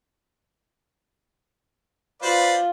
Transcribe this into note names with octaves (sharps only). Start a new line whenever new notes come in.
F4 B4 C5 D5